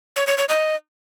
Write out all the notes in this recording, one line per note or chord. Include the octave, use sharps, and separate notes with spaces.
C#5
C#5
C#5
D#5